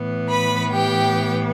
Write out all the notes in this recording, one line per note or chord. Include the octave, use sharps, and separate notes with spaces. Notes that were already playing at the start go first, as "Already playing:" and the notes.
Already playing: A2 E3 B3
B4 B5
G4 G5